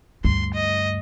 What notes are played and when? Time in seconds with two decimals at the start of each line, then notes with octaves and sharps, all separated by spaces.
0.24 D2 G2 C6
0.54 D#5